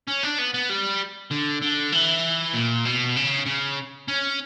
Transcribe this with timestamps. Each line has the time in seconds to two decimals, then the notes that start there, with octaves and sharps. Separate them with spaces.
0.07 C#4
0.23 D4
0.38 B3
0.54 B3
0.69 G3
1.31 D3
1.62 D3
1.92 E3
2.54 A#2
2.85 B2
3.16 C#3
3.46 C#3
4.08 C#4